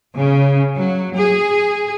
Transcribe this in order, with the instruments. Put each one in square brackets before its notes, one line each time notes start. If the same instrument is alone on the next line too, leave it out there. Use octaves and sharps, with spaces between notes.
[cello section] C#3
F#3
G#4